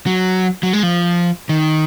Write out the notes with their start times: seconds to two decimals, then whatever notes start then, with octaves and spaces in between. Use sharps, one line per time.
0.06 F#3
0.63 F#3
0.73 G#3
0.83 F3
1.49 D#3